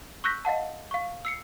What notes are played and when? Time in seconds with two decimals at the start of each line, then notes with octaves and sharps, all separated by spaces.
0.24 C#6 E6 F#6 G6 A#6 B6
0.45 D#5 F5 F#5 A5
0.91 F5 C#6
1.25 E6 C7 C#7